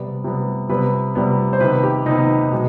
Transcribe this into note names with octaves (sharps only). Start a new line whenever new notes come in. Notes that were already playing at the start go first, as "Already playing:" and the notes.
Already playing: C3 G3 B3 D5
C3 G3 B3
C3 G3 B3 B4
C3 G3 B3
C5
C3 D#3 B3 B4
G4
C3 D#3 B3 D#4
B2 G#3